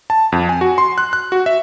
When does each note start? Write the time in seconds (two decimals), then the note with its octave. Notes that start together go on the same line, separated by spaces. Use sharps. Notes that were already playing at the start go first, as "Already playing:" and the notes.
0.10 A5
0.32 F2
0.49 G#5
0.61 F#4
0.78 C6
0.98 F#6
1.13 F#6
1.32 F#4
1.46 E5